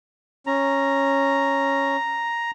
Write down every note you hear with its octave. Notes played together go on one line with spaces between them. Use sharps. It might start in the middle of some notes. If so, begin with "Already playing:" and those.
C#4 A#5